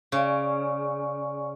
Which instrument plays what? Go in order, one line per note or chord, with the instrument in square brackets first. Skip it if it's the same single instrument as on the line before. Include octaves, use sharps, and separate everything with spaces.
[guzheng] C#3 [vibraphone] D5 G#5 C#6